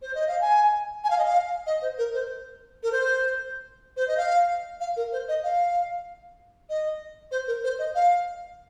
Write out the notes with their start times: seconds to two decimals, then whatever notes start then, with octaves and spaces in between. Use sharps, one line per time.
0.02 C5
0.15 D#5
0.28 F5
0.41 G#5
1.04 G#5
1.10 F5
1.18 D#5
1.25 F5
1.66 D#5
1.82 C5
1.98 A#4
2.14 C5
2.83 A#4
2.92 C5
3.97 C5
4.08 D#5
4.17 F5
4.80 F5
4.96 A#4
5.12 C5
5.28 D#5
5.43 F5
6.69 D#5
7.31 C5
7.47 A#4
7.64 C5
7.79 D#5
7.95 F5